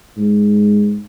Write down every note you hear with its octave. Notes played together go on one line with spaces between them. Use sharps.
G#2